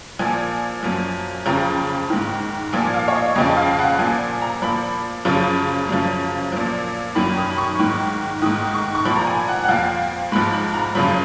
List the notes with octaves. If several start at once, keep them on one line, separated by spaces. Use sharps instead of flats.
A#2 F3 G#5
F#2 F3
F2 C#3 F3 A#5
G#2 D#3
A#2 F3 G#5
F5
C#5
D#5
F2 C#3 F3 D#5
F5
F#5
A#2 F3 G#5
A#5
A#2 F3 B5
F#2 C#3 F3
F#2 C#3 F3
A#2 F3
F#2 D#3 B5
D#6
B5
C#6
G#2 D#3
G#2 D#3 D#6
C#6
C#6
A#2 F3 B5
A#5
G#5
F#5
F#5
F2 F3 F5
G#2 F3 B5
B5
A#5
F#2 C#3 F3 B5